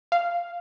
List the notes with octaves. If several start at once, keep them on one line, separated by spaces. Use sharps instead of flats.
F5